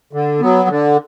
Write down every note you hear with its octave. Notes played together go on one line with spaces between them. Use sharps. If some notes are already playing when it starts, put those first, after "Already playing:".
D3
F#3 B3
D3